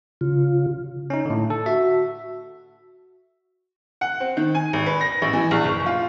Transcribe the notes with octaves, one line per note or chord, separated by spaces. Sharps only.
C#3 F4
C#4 D#4
A2 D3
A4 A5
F#4 E5
F#5
C4
D#3
G#5
G#1
B4
A#6
A1
E3
A#1
F#1
F4